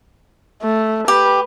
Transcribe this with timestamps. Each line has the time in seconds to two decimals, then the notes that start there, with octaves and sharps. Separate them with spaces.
0.62 A3
1.08 G4 B4